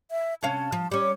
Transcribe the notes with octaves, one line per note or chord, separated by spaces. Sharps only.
E5
C3 C#4 F5 A5
F3
G3 C#4 D6